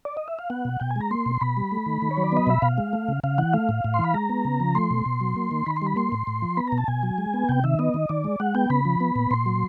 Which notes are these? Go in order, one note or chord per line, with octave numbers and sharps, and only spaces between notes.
D5
D#5
E5
F5
B3 F#5
B2
B2 G5
G#5
G#3 A#5
A#3 C6
B2
B2 B5
G3
A3
D#3
D#3
C#5
F#3
D5
B3 D#5
B2 E5
B2 F5
G#3
A3
C#3
C#3 F5
E3 F#5
A3 F5
A2
A2
C6
E3
B5
G#3 A#5
B3
C#3
F3
A3 C6
B2
B2
F#3
A#3
D#3
D#3 B5
C6
G3 B5
A#3 C6
A2
A2
F3
B3 B5
B2 A#5
A5
B2 G#5
F#3
G#3
B3
C3 G5
D#3 E5
B3 D#5
D#3
D#3 D5
G#3
G#3 F#5
B3 G5
C#3 B5
F3
B3
A#2
A#2 C6
F#3